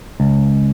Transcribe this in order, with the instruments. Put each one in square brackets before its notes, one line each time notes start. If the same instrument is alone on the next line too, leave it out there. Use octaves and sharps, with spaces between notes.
[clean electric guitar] C#2